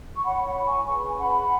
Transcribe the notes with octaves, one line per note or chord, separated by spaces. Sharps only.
C#6
E4 C#5 F#5 B5
F#5 B5
G#5 C#6
C#4 G#4 B4 C#6
B5
G#5
F#5 B5